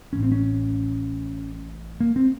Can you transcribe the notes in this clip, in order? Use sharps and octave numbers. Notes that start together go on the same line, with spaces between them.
A1 A2 C#4
C4
C#4
A#3
C4